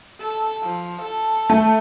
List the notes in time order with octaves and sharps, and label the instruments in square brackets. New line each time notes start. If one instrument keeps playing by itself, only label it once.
[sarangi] A4
F3
A4
[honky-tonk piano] A3